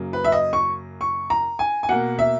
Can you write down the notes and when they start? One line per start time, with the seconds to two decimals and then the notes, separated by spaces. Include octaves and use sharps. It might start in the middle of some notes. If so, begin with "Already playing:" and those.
Already playing: F#2 C#3 F#3 A#3
0.13 B4
0.24 E5
0.32 D#5
0.53 C#6
1.01 C#6
1.30 A#5
1.59 G#5
1.83 G#5
1.89 B2 A#3 F#5
2.19 E5